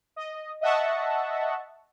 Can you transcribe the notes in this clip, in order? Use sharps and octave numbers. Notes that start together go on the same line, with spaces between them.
D#5
D#5 E5 F#5 A5 C#6